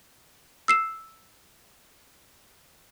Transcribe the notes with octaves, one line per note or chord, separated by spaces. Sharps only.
E6 C7 E7